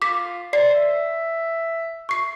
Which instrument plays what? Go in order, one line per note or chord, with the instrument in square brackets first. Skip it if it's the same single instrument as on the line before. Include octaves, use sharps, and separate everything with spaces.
[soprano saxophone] F4 [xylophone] D6 B6
[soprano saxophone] C5 [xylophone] D5 C7
[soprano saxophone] E5
[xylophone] C#6 C7